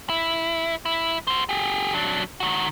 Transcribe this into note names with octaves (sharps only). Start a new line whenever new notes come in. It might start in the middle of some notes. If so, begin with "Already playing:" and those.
E4
E4
F#4 C5
G4 G#4
F#3 D4
D#3 F#4